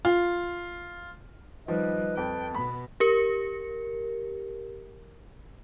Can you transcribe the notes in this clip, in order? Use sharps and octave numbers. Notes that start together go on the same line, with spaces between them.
F4
D#3 F3 G3 B4 D#5
F2 G5 A5
B2 B3 B5
G4 A#4